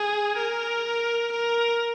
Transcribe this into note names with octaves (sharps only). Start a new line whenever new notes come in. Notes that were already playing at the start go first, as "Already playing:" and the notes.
Already playing: G#4
A#4
A#4